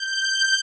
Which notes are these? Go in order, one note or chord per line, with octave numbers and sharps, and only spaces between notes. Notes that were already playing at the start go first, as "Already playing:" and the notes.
Already playing: G6